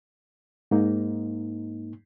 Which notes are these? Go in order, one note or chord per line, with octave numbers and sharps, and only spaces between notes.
G#2 A#3 D#4